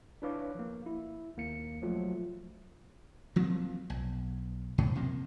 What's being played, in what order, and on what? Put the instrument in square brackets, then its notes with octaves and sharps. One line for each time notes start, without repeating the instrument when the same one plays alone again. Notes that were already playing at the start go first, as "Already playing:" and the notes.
[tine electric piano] D4 E4 B4 C#5 F5 D6
F3 A#3
E4
D#2 A#3 C#7
F3 F#3 A3 F4 F#4
[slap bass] F3 F#3 A#3 C4
B1
G#2 B2
C3 F3 A#3